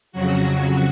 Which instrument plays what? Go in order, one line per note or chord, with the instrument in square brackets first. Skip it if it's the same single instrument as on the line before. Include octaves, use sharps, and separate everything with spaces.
[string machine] F2 C#3 F#3 F#4